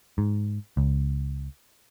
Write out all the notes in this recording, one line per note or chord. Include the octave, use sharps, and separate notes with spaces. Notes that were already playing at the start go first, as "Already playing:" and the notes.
G#2
C#2